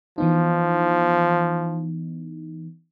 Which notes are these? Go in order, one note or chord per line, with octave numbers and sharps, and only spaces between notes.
E3 F3 B3 D#4